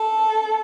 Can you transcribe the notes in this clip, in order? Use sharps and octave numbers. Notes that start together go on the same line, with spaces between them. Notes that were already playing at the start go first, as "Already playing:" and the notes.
Already playing: A4